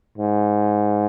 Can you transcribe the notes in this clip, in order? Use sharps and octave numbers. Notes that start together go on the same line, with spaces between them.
G#2